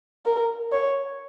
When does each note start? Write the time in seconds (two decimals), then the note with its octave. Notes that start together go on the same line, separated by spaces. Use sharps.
0.26 A#4
0.72 C#5